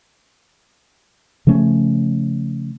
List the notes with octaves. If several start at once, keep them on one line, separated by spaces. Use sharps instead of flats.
C#3 F3 A3 C#4